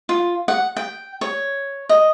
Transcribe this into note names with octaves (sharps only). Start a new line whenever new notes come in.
F4
F#5
G5
C#5
D#5